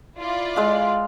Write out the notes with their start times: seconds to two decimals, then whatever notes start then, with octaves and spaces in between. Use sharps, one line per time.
0.19 E4 F4 D5
0.56 G#3 F5